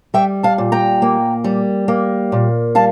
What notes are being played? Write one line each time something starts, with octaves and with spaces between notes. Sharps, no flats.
G3 E5 G5
F5 A5
A#2
G5 A#5
A#3
G3
A#3
A#2
G3 F5 A5